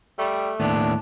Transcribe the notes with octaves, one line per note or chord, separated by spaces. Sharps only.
G3 A3
D#2 A2 B3 D4